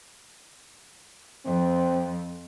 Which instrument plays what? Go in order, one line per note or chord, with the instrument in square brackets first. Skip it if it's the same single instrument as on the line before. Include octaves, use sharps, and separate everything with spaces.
[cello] F2 [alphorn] C4